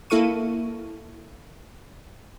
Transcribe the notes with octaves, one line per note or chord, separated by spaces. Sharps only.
A#3 E4 A4 F5 C#6 D#7